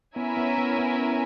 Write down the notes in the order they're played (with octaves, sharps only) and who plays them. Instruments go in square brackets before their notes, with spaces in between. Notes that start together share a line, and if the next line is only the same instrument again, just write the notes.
[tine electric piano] B3 [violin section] C#4 E4 A#4 E5 G#5
[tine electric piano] B3
B3
B3